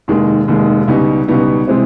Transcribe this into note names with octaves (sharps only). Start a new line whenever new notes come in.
F1 D#2 D#3 G#3
F1 D#2 D#3 G#3
C#2 B2 G3 B3 D#4
C#2 B2 G3 B3 D#4
C3 E3 G#3 C4